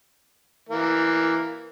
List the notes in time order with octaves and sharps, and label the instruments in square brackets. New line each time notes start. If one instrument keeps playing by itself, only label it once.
[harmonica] E3 A#3